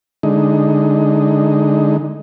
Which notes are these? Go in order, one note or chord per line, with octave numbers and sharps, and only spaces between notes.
D3 G#3 D#4